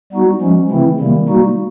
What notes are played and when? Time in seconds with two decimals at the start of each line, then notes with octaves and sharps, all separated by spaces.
0.13 G3 B3 D#4 F#4
0.41 F3 G#3 C#4
0.71 C#3 E3 A3 C4 E4
0.99 C3 D#3 G3 A#3
1.28 G3 A#3 D#4 F#4